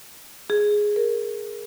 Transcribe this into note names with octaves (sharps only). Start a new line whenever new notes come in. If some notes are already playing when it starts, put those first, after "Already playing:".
G#4
A#4